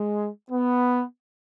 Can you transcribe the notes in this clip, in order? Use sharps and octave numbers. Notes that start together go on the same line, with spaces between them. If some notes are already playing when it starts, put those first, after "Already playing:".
Already playing: G#3
B3